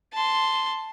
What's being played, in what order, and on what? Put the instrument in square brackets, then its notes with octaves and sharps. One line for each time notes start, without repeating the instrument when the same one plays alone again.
[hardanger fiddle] A5 C6